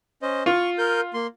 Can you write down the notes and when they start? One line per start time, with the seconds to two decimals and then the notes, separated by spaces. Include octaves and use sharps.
0.22 C#4 C5 D#5
0.46 F4 C#6
0.78 A#4 G6
1.14 A#3 C6